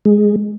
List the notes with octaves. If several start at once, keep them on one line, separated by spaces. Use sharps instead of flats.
G#3